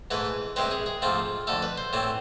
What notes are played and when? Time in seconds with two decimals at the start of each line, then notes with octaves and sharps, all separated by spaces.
0.11 G#2 E3 A3 B4
0.56 C2 C3 G#3 C4 B4
0.71 G#4
0.86 G#4
1.02 G#2 F3 A3 C4 F4
1.47 F2 D3 A3 A4
1.62 B4
1.78 C5
1.93 A2 E3 A3 C4